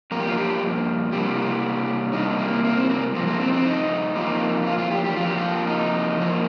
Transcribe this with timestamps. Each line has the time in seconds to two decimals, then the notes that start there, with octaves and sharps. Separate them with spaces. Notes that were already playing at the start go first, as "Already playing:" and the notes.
0.11 G2 F3 A#3 A#4
0.20 G4
0.29 F4
0.38 G4
1.12 C3 G3 A#3 G4
2.13 C3 G3 A#3 D#4
2.39 A#3
2.64 A#3
2.76 C4
2.90 A#3
3.14 G2 F3 A#3
3.27 A#3
3.40 C4
3.53 C4
3.66 D#4
4.16 F2 F3 A#3
4.67 F4
4.78 F4
4.91 G4
5.04 G4
5.16 F2 F3 A#3 F4
5.26 G4
5.38 F4
5.67 D#4
6.18 F2 F3 A#3